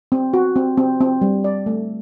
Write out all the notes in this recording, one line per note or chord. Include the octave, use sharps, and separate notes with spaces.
C4
F#4
C4
C4
C4
G3
D5
A3